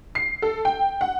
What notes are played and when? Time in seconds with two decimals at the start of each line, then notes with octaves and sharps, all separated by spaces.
0.15 C7
0.42 A4
0.65 G5
1.01 F#5